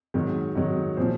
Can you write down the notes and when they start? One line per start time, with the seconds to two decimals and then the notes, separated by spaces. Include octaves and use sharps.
0.14 G#2 D#3 F#3
0.55 G#2 D#3 F#3
0.97 A#2 F3 C5